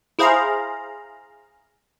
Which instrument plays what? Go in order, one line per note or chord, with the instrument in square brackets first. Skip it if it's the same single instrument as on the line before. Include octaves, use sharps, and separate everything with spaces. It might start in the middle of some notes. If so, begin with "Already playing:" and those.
[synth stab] E4 G#4 C5 F5 A#5